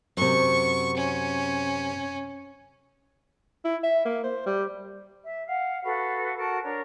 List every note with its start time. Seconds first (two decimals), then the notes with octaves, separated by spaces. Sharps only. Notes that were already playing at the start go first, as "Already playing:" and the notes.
0.17 F#2 C3 C#6
0.97 C#4
3.65 E4
3.83 E5
4.05 A#3
4.24 C5
4.46 G3
5.24 E5
5.46 F5 F#5
5.83 F#4 A4 B4 F5
6.36 F#4 A4 A#4 A5
6.63 D4 A#4 C#5